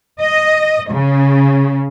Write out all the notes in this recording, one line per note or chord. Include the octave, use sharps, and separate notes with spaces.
D#5
C#3